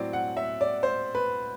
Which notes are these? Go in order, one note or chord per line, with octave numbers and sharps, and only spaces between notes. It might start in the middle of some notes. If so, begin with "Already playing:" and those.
Already playing: A2 F#3 C4 D5
F#5
E5
D5
C5
B4